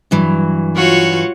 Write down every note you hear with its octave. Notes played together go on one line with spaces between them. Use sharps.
G2 E3 F#3
F4 F#4 C#5